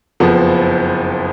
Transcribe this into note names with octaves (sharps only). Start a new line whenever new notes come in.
F#1 F2 F3 B3